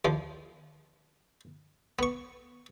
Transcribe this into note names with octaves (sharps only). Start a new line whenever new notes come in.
D#2 F3
B3 C#6